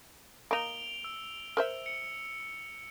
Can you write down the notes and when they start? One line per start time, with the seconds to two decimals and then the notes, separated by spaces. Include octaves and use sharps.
0.51 A#3 D#4 D7 F7 G7
1.04 E6
1.57 A#4 C5 E5 E6
1.86 C#7